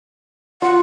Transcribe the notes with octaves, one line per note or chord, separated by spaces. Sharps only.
F4 F#5